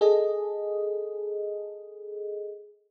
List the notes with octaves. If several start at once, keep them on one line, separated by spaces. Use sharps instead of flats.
G#4 A4 D#5